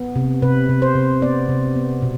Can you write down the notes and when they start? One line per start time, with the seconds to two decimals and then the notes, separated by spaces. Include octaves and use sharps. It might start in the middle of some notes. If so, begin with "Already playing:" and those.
Already playing: B3
0.16 C3
0.42 C3 B4
0.69 C3
0.82 C5
0.96 C3
1.22 B3 D5
1.49 C3
1.76 B3
2.02 B2